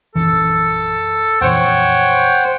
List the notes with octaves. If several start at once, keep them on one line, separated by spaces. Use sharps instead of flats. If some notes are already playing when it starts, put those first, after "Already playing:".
A#1 F#2 E3 A4
F2 A#2 E3 C5 C#5 F#5 G5